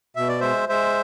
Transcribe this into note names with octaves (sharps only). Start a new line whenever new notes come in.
B2 E5
D5
G#3 C5 E5
G#3 C5 E5